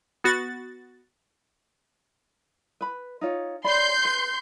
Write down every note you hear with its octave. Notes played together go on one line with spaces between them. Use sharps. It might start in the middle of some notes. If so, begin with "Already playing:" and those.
B3 F#4 A6
B4 B5
D#4 F4 C#5
C#5 D5 B5 C6 G6
B4